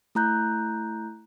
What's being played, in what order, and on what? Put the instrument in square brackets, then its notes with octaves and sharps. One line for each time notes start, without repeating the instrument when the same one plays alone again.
[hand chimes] A3 E4 A#5 F#6 G6